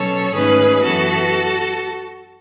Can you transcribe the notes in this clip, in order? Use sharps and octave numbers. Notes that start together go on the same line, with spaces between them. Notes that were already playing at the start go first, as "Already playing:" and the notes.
Already playing: B2 F#3 C#4 A4 C#5
G#2 D#3 A3 C#4 G#4 B4
F#2 E3 B3 F#4 A4